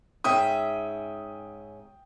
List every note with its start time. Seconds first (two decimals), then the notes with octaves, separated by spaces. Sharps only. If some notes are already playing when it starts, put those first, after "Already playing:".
0.24 G#2 C#4 E5 G5 D#6